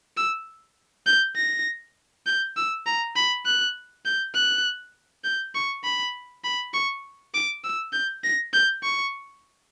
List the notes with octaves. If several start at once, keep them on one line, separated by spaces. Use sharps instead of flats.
E6
G6
A#6
G6
E6
A#5
B5
F#6
G6
F#6
G6
C#6
B5
B5
C#6
D6
E6
G6
A#6
G6
C#6